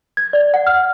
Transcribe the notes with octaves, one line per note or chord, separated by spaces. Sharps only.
G#6
D5
F#5
F6